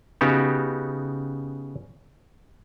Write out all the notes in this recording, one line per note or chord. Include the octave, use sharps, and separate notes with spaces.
C#3 B3 D#4 F#4 G4